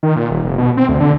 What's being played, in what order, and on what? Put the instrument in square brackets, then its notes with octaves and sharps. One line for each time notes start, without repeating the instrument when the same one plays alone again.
[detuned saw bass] D#3
A#2
D#1
F1
B2
C4
D2
D3